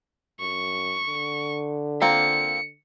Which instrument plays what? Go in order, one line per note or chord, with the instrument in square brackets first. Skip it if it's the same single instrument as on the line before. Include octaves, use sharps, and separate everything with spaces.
[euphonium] F#2 [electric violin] C#6
[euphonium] D3
[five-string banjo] A#3 C4 F4 [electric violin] C#7